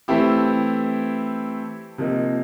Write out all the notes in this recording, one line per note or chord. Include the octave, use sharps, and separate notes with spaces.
E3 A3 C4 E4 G4
C3 F3 A#3 D#4